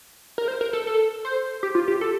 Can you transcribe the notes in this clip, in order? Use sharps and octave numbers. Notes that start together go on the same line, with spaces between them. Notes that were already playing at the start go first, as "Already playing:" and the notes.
A#4
C5
A#4
A4
A4
C5
G4
F4
G4
A4